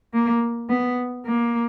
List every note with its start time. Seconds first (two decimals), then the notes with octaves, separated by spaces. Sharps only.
0.13 A#3
0.69 B3
1.25 A#3